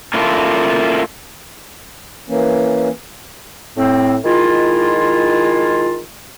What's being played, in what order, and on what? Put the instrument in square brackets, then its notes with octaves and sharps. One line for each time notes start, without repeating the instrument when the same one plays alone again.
[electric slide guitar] A#3 C#4 E4 F4 A4
[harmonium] E3 A#3 C#4
[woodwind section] A2 C4
D#3 G#3 E4 F4